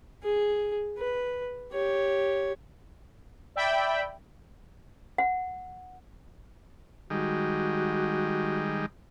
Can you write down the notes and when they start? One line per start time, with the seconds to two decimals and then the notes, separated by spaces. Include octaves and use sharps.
0.23 G#4
0.98 B4
1.73 G4 C#5
3.56 D5 E5 G5 B5
5.18 F#5
7.10 D#3 G3 G#3 F#4